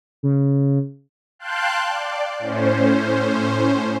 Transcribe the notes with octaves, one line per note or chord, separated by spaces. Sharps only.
C#3
F5 G5 A5 C6 F#6 G6
D5
A2 C#4 C5